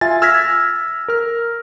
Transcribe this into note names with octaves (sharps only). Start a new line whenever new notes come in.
F4 E5 G#5 A6
E6 F6 G#6 A#6 B6
A#4 F6